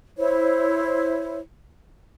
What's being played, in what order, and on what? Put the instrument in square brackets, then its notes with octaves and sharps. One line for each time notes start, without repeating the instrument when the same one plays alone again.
[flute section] E4 C5 C#5